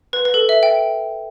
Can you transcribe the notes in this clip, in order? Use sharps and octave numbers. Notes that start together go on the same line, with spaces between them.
B4
B4
A4
E5
G5